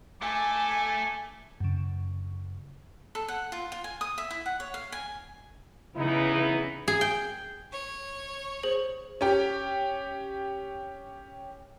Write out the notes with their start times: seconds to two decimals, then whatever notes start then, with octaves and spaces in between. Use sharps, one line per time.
0.22 A3 A4 G#5 D6
1.60 F#2 C#3
3.15 A4
3.28 F#5
3.52 F4
3.72 F4
3.84 G#5
4.01 D#6
4.18 E5
4.31 E4
4.46 F#5
4.60 C#5
4.74 F5
4.92 G#5
5.96 C#3 E3 B3 D#4 E4
6.88 G#4
7.01 G5
7.72 C#5
8.63 G#4 C5 F#7
9.21 C#4 G4